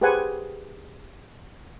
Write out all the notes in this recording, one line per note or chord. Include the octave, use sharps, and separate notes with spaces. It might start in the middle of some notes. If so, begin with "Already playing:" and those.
G4 G#4 B4 C5 F#5 G#5